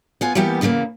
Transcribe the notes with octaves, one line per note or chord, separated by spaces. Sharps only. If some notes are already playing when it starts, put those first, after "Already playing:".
B3 F4 G#5
E3 G3 A#3 B3 G4
E2 C#3 E3 A3 A#3